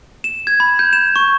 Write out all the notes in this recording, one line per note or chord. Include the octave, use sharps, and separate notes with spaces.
E7
G#6
B5
G6
E7
C#6